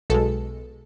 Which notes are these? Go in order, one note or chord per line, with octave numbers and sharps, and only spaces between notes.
B1 B2 G#3 A4